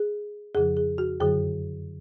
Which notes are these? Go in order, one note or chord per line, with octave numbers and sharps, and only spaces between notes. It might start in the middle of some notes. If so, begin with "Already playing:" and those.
Already playing: G#4
F2 C#3 F3 G#4
G#4
F#4
F#2 D3 F#3 G#4